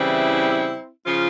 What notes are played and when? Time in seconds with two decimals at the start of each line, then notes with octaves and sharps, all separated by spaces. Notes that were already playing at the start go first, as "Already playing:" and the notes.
Already playing: C#3 E3 G3 C4 E4
1.06 C#3 F3 C#4 F4